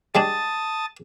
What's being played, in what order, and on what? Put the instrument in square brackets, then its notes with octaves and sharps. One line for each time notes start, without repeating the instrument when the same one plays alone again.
[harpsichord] G3 G#3 D4 [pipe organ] A5 D#6 A6